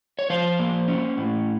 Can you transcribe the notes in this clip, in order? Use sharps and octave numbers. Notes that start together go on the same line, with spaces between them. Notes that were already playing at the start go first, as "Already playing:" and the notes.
C#5
F3 C5
A#3
C#4
A2